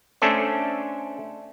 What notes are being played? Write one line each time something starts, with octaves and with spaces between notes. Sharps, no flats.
A3 C#4 D4 A4 C5